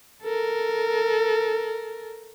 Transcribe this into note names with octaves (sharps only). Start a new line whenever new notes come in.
A4 A#4